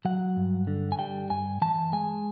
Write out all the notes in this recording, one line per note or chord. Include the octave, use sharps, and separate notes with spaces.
F#3 F#5
G2
D3
G#5
G3 G5
G2 G#5
E3 A5
G#3 G#5